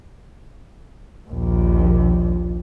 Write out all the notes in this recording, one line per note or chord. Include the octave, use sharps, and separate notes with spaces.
A#1 D#2